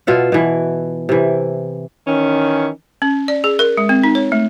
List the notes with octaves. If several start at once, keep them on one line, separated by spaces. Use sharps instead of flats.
B2 F4 E5 F#5
B2 E3
C3 E3
D#3 E3 C#4
C#4
D5
G#4
A#4
G#3
C4
D#4
C#5
A3